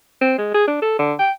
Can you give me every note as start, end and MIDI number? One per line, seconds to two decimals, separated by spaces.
0.21 0.38 60
0.38 0.54 56
0.54 0.66 68
0.68 0.79 62
0.82 0.98 69
0.99 1.14 50
1.19 1.31 79